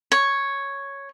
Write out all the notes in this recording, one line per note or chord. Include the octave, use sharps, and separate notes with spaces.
C#5